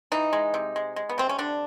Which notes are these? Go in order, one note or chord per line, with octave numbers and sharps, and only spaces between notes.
E3 D#4
G#3
C3
G#3
G#3
B3
C3 C4
C#4
D3 D4